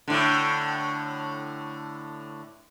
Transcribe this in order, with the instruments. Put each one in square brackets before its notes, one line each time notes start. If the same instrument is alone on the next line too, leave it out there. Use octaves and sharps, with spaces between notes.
[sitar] A2 D3